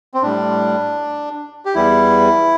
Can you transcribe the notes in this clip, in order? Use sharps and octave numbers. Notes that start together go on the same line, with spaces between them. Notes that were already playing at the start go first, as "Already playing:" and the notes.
C4
A2 G3 D4
G4
E2 E3 G3 E4